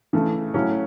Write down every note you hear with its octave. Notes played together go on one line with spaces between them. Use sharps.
C#3 E3 A3
C#3 F#3 A3 C#4 E4